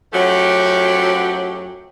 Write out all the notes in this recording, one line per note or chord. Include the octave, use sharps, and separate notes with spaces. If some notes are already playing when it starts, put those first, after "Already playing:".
F#2 F3 F#3 A3 C#4 G4